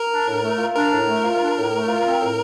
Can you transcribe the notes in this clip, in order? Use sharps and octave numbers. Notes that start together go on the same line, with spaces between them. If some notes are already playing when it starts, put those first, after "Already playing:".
Already playing: A#4
D4
A2
A3
F4
D4 A#4
A2
A3
F4
D4
A2
A3
F4
C4
A2